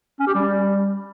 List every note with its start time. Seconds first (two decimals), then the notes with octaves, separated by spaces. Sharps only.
0.20 C#4
0.27 G4
0.34 G3